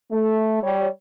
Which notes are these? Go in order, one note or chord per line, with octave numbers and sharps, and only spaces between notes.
A3
G3 C#5